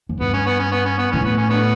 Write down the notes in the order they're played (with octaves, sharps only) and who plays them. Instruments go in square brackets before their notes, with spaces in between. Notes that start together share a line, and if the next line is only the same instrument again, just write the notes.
[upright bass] F#2
[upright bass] G2 [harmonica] B3
[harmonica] C#4
B3
C#4
B3
C#4
B3
[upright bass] A2 [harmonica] C#4
[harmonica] B3
C#4
D3 B3